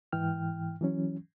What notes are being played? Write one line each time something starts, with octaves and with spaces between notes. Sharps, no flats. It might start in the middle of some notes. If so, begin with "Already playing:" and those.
G#2 E3 G5 F6
E3 F#3 C#4